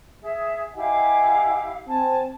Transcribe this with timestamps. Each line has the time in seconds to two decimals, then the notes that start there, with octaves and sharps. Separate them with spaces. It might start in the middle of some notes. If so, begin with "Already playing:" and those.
0.22 G#4 E5
0.75 E4 G4 D#5 F5 F#5 G#5
1.87 C4 G#5 A5